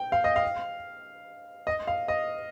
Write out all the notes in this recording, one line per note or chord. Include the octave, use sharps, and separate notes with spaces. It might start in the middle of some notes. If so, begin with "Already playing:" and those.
Already playing: G5
F5
D#5
F5
D#5
F5
D#5